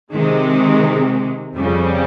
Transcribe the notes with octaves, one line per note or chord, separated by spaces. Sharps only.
C3 D#3 G#3
F2 C#3 G3